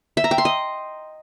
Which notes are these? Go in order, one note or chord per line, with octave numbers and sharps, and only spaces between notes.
E5
A#5
G5
C6
D#5